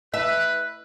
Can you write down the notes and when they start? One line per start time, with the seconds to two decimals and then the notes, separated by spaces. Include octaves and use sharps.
0.14 B4 E5